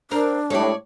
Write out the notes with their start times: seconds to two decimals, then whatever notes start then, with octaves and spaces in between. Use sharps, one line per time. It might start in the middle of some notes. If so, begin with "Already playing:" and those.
0.11 C4 D4 A#4
0.50 A2 G3 G#3 A4 C#5 D5